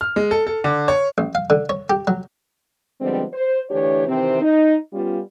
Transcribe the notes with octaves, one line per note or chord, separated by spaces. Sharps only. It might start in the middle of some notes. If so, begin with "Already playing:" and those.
F6
G#3
A4
A4
D3
C#5
A1
F5
D3
C#5
G4
F#3
D3 F3 G3 G#3 B3 C4
C5
D2 E3 D4 G4 C#5
C3 D#3 E3 C4
D#4
G3 B3 C#4 F4